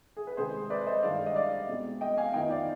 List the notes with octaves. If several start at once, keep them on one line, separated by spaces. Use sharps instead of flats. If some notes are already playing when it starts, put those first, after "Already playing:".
G#4
B4
C3 D#3 G#3 G#4 C5
B4 D5
C5 D#5
G2 D#3 G#3 D4 D5 F5
D#5
D5 F5
B2 G#3 C4
D#5 G5
F5 G#5
F2 D#3 B3 D#4 D#5 G5
D5 F5